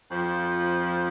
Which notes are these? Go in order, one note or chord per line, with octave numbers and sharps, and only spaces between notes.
F2 F3